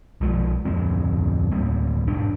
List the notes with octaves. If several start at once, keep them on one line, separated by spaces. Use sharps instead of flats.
B1 F3 G#3
D1 F2 G#3 C4
D2 A2 G3 A#3
E1 G#2 D4